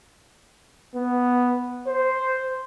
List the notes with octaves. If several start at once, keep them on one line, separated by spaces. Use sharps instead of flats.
B3
C5